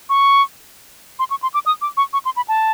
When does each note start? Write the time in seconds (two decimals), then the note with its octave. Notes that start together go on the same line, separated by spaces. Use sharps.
0.09 C#6
1.19 C6
1.30 C#6
1.42 C6
1.54 D6
1.66 D#6
1.82 D6
1.97 C#6
2.13 C#6
2.25 C6
2.36 B5
2.48 A5